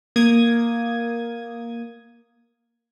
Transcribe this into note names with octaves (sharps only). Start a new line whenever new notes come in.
A#3 D#6 G#6